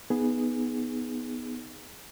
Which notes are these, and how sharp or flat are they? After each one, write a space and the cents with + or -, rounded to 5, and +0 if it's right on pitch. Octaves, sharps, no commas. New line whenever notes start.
B3 +0 D#4 +0 G#4 +0